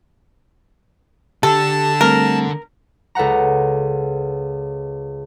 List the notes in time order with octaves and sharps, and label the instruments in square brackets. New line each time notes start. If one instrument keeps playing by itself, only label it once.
[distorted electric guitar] D3 [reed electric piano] G4 [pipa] A4 [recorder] A5
[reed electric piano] G3 A3 C4 [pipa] A#4
[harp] C#2 A4 B4 F#5 A#5